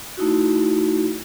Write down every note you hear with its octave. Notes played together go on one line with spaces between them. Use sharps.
A3 D#4 E4 F#4